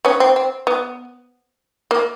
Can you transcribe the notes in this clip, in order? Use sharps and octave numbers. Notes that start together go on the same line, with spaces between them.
B3 C#4
C4
C4
B3
A#3